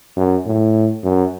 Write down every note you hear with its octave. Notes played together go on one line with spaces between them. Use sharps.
F#2
A2
F#2